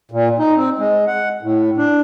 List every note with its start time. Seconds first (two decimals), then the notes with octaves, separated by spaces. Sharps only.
0.11 A#2
0.39 D#4
0.56 C4
0.78 G#3
1.07 F#5
1.42 A2
1.78 D4